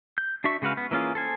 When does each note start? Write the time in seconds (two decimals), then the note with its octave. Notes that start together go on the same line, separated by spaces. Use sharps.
0.18 G6
0.44 D4 F#4 E5 C#6
0.62 C#3 G#3 F#4 B4 F5
0.77 B3
0.91 E3 A#3 C#4 F4 G#4
1.15 A4 C5 G#5